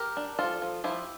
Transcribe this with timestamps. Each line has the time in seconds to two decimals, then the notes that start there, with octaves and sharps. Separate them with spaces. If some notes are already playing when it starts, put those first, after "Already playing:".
Already playing: G4 A#4
0.17 D4
0.39 F3 F4 A4
0.62 F3
0.84 F3 E4 G4